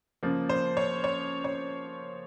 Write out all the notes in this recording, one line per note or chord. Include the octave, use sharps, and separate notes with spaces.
C#3 F3 A#3
C5
C#5
C#5
C#5